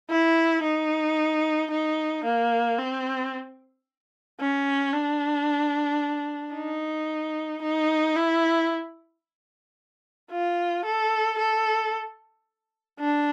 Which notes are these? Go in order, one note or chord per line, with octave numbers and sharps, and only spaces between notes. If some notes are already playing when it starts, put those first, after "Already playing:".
E4
D#4
D#4
A#3
C4
C#4
D4
D#4
D#4
E4
F4
A4
A4
D4